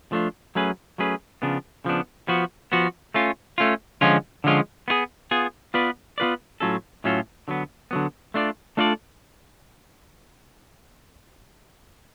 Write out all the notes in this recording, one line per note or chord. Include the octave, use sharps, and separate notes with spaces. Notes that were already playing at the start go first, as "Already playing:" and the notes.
F3 A3 D4 F4
F#3 A3 C#4 G#4 B4
F#3 A3 C#4 G#4 B4
C#3 F3 B3 D4
C#3 F3 B3 D4
F3 B3 F#4
F3 B3 F#4
A3 C#4 F4
A3 C#4 F4
D3 F3 G#3 C#4 F4
D3 F3 G#3 C#4 F4
B3 F4 G#4
B3 F4 G#4
B3 F4 B4 D5
B3 F4 B4 D5
A2 F#3 C#4 F4 A4
A2 F#3 C#4 F4 A4
D3 F#3 B3
D3 F#3 B3
A3 D4 F4 A4 D5
A3 D4 F4 A4 D5